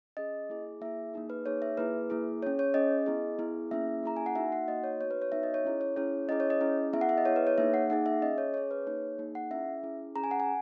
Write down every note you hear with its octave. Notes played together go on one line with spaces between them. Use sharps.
C#4 G#4 D#5
A#3 E4 G#4
A#3 E4 G#4 E5
A#3 D#4 G#4
B4
A#3 D#4 G#4 C#5
E5
A#3 E4 G#4 B4
A#3 E4 G#4
C#4 G#4 C#5
C#5
C#4 G#4 D#5
B3 E4 G#4
B3 E4 G#4
A#3 C#4 E4 G#4 E5
A#3 C#4 E4 G#4 A#5
G#5
F#5
A#3 D#4 F#4 E5
F#5
A#3 D#4 F#4 D#5
C#5
B3 D#4 F#4 C#5
B4
C#5
B3 D#4 F#4 E5
D#5
C#5
C#4 E4 G#4
C#5
C#4 E4 G#4 C#5
C#4 E4 G#4 D#5
C#5
D#5
C#4 E4 G#4
B3 E4 G#4 E5
F#5
E5
D#5
B3 E4 G#4 C#5
B4
C#5
A#3 D#4 G#4 E5
F#5
A#3 D#4 G#4 F#5
E5
C#4 G#4 D#5
C#5
C#4 G#4 C#5
B4
A#3 D#4 G#4 C#5
A#3 D#4 G#4
F#5
C#4 E4 G#4 E5
C#4 E4 G#4
C#4 G#4 A#5
G#5
F#5
G#5